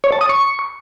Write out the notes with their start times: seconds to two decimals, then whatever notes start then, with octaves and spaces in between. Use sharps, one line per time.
0.04 C#5
0.12 A5
0.21 D#6
0.29 C#6